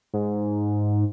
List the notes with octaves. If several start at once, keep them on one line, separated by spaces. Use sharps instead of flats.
G#2